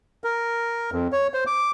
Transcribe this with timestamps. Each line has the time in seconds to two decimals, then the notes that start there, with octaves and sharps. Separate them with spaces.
0.24 A#4
0.92 F2
1.12 C#5
1.34 C5
1.47 D6